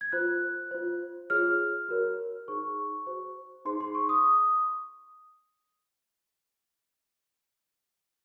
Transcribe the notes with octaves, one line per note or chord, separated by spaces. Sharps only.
G#6
F4 C5 F#6
F4 C5
F4 G#4 C#5 F6
F#4 A#4 C#5
D#4 G#4 C5 C#6
F#4 C5
D#4 G#4 C5 C6
C6
C#6
D#6